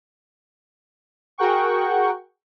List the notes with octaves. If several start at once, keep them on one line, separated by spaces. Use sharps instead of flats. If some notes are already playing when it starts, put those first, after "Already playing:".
F#4 G#4 A#4 F#5 G5 C#6